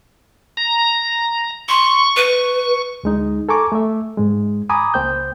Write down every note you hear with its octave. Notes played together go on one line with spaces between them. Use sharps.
A#5
C6 C#6
B4
D2 G#3 D#4
A4 G#5 A#5 C#6 D6
A3 E5
G#2 G#3
G#5 A#5 B5 D6 D#6
C#2 A#3 C5 G5 G6